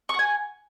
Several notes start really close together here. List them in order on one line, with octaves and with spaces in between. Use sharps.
C#6 F#5 G#5